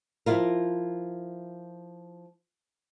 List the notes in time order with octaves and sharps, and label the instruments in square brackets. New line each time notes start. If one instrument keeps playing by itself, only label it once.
[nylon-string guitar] F3 E4 F4 A#4